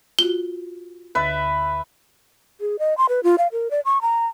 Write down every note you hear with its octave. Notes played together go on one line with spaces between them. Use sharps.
F4 F#4 G7
D2 D3 B4 E5 A6
G#4
D#5
C6
B4
F4
F5
A#4
D5
C#6
A#5